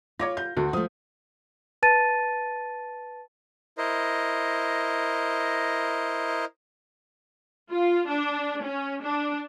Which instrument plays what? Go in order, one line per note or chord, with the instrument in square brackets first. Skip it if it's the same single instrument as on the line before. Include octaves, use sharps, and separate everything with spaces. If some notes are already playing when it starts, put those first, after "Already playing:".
[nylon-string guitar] F4 [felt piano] C#5 D6 A#6
[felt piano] G6
[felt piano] D2 [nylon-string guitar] F#4
[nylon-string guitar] F3 A3 [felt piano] D#6
[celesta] B4 A5 A6 D#7
[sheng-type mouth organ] E4 A#4 C5 D#5
[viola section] F4
D4
C#4
D4